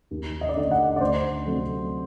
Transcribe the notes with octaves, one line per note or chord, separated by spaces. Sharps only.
D#2
D#5
D5
D3 A3 D#5
F#5
D5
D2 C5
C3 F#3 A3